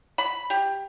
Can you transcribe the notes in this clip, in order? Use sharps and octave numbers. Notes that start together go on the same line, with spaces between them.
B5
G4